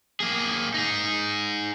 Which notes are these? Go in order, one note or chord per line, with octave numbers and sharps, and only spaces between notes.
A#3 G#4
D#4 G#4